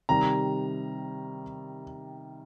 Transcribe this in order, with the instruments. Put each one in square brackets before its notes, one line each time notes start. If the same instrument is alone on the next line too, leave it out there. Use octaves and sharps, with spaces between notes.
[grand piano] C3 D#3 G3 A#5